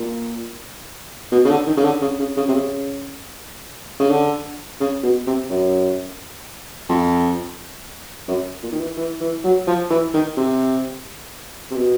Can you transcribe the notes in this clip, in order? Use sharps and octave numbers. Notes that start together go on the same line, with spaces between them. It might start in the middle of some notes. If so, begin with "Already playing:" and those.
Already playing: A#2
B2
C#3
D3
D#3
C#3
D3
C#3
C#3
C#3
C3
C#3
C#3
D3
C#3
B2
C3
F#2
F2
F#2
A#2
D#3
E3
E3
E3
F#3
F3
E3
D#3
C3
C3
B2